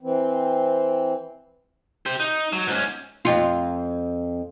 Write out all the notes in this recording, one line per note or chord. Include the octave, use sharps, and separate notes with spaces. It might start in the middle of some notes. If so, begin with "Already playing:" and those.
E3 C4
G4 C5
D#4
F#3
G#2 C#4
F2 F4